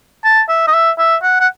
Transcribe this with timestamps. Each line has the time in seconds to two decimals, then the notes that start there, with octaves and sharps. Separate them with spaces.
0.24 A5
0.49 E5
0.68 D#5
0.74 E5
0.99 E5
1.23 F#5
1.41 F#5